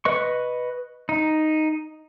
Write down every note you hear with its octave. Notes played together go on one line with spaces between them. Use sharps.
B4 D#5 C#6
D#4